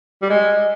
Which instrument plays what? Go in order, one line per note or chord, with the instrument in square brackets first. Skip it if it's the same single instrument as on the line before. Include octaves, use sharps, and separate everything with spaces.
[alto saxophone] G3
G#3